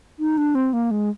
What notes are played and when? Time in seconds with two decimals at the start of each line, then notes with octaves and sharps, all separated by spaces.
0.19 D#4
0.38 D4
0.55 C4
0.73 A#3
0.91 G#3